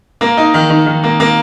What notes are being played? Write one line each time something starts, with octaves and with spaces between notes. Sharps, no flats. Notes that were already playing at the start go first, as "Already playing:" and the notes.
A#3
D#4
D#3
D#3
D#3
A#3
A#3